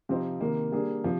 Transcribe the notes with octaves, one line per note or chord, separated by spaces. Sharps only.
C3 F3 C4 D#4
C3 D#3 A#3
G3 A#3 D4 G#4
C3 F3